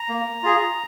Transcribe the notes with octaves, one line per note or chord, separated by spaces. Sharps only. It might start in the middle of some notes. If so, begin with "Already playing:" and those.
Already playing: A#5
A#3
F4 G#4